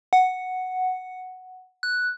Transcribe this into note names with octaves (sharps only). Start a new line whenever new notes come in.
F#5
F#6